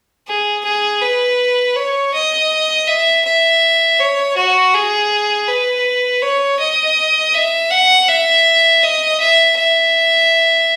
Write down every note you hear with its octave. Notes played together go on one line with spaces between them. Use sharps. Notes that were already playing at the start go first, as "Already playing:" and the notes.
G#4
G#4
B4
C#5
D#5
E5
E5
C#5
F#4
G#4
B4
C#5
D#5
E5
F#5
E5
D#5
E5
E5